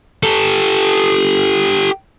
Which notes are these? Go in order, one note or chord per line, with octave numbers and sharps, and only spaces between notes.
G4 A4